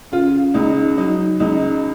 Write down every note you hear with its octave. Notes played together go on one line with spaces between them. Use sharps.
C#3 F4
C#2 D#4
F#3 D#4
C#2 D#4